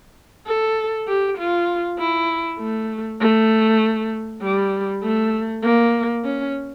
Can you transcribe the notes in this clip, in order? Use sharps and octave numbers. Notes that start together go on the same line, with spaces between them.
A4
G4
F4
E4
A3
A3
G3
A3
A#3
C#4